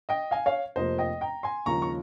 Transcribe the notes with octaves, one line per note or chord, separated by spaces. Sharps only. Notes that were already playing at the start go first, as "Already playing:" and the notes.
D#5 G5
F5 G#5
C#5 F5
F1 F2 C3 F3 A#3 C5 D#5
D#5 G5
G5 A#5
G#5 C6
D#2 C#3 F3 G#3 A#5 C#6
C#6